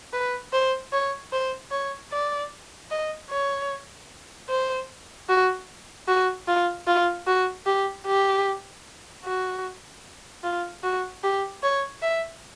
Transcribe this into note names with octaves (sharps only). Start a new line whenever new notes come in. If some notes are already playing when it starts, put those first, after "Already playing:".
B4
C5
C#5
C5
C#5
D5
D#5
C#5
C5
F#4
F#4
F4
F4
F#4
G4
G4
F#4
F4
F#4
G4
C#5
E5